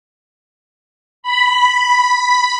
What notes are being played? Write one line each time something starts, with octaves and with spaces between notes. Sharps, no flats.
B5